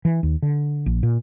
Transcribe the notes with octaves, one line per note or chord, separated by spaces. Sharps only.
E3
D#2
D3
A#1
A#2